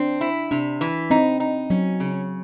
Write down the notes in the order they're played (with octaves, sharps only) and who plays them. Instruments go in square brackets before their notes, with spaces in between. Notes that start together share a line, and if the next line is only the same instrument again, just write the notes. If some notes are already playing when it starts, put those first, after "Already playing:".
Already playing: [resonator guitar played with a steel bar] C4 [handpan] D4
[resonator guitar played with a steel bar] E4
[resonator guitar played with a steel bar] C3 [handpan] D4
[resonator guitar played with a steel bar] E3
[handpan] C4 [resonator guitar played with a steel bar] D#4
[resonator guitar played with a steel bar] D#4
[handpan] F#3 [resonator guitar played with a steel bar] C#4
[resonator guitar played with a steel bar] C#3